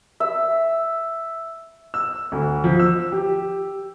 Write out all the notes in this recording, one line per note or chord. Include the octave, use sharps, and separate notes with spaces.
E5
E6
D2
F3
E6
G4